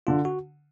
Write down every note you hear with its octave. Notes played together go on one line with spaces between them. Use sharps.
D3 F4
F#4